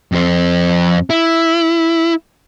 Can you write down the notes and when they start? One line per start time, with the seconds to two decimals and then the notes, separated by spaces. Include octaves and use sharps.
0.12 F2 C5
1.10 E4